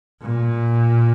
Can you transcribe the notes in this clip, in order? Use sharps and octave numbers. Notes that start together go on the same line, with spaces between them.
A#2